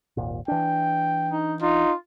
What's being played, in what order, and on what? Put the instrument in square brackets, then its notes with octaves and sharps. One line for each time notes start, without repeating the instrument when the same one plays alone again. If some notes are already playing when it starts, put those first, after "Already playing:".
[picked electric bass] D#1 G#1 A#2
[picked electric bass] E3 D4 [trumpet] G5
[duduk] D#4
[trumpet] D#4 [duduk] F4